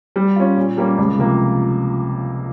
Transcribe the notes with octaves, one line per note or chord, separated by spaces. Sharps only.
G3
C#4 F4
A#2
G3 A#3 C#4
C#2
C3 F3 A#3